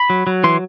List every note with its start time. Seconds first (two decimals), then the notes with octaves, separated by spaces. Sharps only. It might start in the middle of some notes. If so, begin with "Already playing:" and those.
Already playing: B5
0.10 F#3
0.27 F#3
0.44 E3 C6